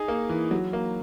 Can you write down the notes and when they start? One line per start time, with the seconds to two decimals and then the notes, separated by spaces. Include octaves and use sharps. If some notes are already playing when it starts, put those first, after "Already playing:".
Already playing: D#4 G#4
0.08 A#3
0.29 E3
0.51 F#3
0.73 A#3